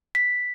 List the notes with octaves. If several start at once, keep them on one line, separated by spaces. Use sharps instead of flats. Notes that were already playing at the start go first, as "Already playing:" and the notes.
B6